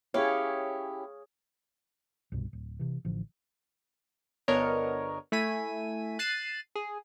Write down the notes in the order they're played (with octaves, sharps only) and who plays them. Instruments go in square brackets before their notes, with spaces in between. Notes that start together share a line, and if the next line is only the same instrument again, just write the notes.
[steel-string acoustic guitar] C#4 E4 G4 [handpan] G#4 C#5 [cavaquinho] F5
[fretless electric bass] C2 G2 B2
D1
C3 E3
A1 D3 F3
[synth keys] G1 B3 D4 A#4 C#5 D#5
A3 E4 G#5 B6 D#7
F#6 A6 C7 D#7 E7
G#4